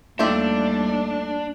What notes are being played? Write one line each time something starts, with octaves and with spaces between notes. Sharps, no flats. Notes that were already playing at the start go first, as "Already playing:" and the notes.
D#2 G3 A3 D4 F4 G4 E5